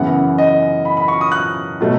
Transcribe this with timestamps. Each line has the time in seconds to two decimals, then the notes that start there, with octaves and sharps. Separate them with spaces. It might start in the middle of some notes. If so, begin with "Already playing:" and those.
Already playing: F#2 C#3 E3 B3 F#5
0.38 D#5
0.85 B5
0.97 B5
1.08 C#6
1.21 D#6
1.32 F#6
1.81 B2 F#3 A3